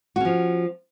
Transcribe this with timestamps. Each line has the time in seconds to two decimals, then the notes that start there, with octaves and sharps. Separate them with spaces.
0.16 F#4
0.20 C#4
0.25 F3